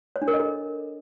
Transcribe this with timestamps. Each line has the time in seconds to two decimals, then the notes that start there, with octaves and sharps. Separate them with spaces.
0.16 C#5
0.22 D4
0.28 A#4
0.34 D#5
0.40 A4